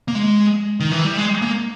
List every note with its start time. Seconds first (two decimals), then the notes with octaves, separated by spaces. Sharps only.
0.08 A#3
0.15 G#3
0.80 D#3
0.91 E3
1.04 G3
1.17 G#3
1.42 A#3